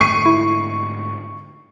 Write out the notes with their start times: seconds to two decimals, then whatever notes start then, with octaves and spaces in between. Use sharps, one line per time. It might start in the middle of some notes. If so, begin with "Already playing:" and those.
0.01 G#2 D3 A3 C#6 C7 D#7
0.26 E4